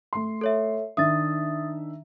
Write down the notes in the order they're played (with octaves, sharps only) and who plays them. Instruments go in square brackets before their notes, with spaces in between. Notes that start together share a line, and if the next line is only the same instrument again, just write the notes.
[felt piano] A3 C6
[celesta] A4 C#5 E5
[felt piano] D#3 D4 E5 [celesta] D#6 A6